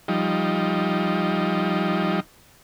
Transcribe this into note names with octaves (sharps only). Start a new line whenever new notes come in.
F3 G3 D#4